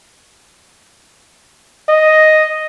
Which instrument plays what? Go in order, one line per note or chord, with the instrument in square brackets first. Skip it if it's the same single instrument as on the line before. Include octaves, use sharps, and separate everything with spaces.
[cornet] D#5